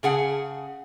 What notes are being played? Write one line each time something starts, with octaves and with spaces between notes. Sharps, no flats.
C#3 G#4 F#5